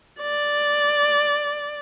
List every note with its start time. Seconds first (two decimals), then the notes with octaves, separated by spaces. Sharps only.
0.21 D5